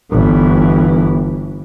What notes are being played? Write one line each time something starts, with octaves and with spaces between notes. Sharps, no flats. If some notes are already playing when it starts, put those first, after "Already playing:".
G1 E3